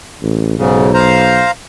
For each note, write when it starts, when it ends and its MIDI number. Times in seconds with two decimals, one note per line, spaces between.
0.22 0.56 33
0.58 1.44 35
0.58 0.92 44
0.58 0.92 49
0.94 1.51 72
0.94 1.51 77
0.94 1.51 82